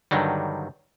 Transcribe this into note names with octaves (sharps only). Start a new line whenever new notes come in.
G2 D3 D#3 F#3 G3